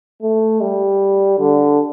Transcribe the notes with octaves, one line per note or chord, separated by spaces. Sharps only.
A3
G3
D3